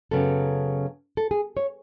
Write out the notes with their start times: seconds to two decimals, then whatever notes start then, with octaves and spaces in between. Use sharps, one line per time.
0.11 F#2 C#3 F#3 B3 A4
1.17 A4
1.31 G#4
1.57 C#5